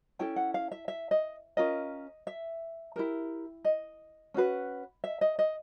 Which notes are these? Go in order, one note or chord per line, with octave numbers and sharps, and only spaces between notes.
C#4 E4 A4 G5
F#5
F5
E5
E5
D#5
C#4 F4 A#4 D#5
E5
E4 G4 A#4
D#5
C#4 F#4 B4
E5
D#5
D#5